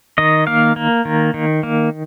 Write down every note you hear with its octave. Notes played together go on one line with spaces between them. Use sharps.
D#3 D#5
A#3 F5
A#3
D#3
D#3
A#3